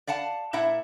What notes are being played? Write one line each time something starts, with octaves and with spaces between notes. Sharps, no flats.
D5 F5 F#5 A5
A#2 E4 E5 F#5